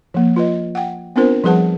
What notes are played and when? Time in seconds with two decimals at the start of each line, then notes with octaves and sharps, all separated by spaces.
0.14 F3 A#3
0.36 F4 B4 D#5
0.75 F#5 G5
1.16 B3 C4 D4 F4 A#4 C5
1.44 F3 G3 G#4 B4 F#5 A5